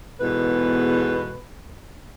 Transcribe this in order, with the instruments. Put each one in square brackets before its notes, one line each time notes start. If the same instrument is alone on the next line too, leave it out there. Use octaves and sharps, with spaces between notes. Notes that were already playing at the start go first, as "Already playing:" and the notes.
[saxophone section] E2 G#2 B2 A4 B4